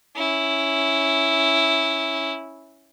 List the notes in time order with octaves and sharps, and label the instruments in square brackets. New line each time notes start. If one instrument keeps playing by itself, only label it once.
[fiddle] C#4 E4